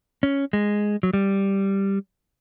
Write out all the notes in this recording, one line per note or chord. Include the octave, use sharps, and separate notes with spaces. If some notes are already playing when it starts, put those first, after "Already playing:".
C#4
G#3
F#3
G3